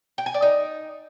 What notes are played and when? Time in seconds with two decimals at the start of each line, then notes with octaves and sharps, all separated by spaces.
0.18 G5
0.26 G#5
0.34 D5
0.42 D#4